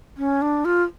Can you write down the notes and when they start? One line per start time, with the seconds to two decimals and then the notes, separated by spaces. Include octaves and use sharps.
0.17 C#4
0.42 D4
0.65 F4